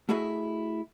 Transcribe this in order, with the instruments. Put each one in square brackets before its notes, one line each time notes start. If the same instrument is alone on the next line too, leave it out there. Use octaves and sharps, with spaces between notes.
[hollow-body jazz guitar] A3 E4 F#4 G#4 D#5 E5